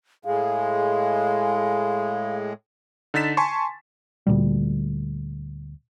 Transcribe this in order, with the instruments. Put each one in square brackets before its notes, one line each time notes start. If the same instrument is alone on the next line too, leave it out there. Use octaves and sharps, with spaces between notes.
[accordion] A2 G#3 [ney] G#4 [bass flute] F5
[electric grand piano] D3 D#4 A6 B6 E7
G#5 A5 C6 C#6
[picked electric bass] D2 A#2 G3